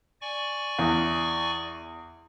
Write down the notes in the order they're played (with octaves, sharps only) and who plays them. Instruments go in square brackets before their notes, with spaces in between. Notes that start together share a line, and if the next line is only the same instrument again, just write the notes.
[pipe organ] D5 G#5 C#6
[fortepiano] E2